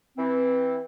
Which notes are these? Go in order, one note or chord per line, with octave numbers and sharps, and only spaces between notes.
E3 C4